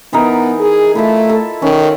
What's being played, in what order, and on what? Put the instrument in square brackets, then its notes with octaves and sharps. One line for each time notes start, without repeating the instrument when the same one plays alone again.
[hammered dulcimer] E3 D#4 A#4 [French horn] B3
[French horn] G#4
[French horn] A3 [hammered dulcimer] E4 F4 E5
[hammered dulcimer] A4
[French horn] D#3 [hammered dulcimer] C#4